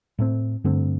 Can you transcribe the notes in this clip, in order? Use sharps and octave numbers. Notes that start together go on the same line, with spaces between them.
A2 A3 C4
G2 D3 A3 C4